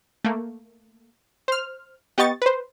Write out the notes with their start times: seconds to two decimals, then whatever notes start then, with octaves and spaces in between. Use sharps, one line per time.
0.24 A3 A#3
1.48 C5 F6
2.18 B3 G4 D#5 C#6 A6
2.42 B4 C5